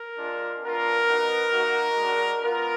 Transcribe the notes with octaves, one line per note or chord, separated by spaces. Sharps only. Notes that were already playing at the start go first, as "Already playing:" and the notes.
Already playing: A#4
G#3 D4 F4
B3 D4 F4 A#4
B3 D#4 F#4
A#3 D#4 F#4
G#3 D4 F#4
B3 F4 A#4